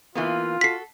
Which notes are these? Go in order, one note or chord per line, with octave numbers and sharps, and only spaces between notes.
E3 A#3 B3 F4
F#4 A4 B6 C7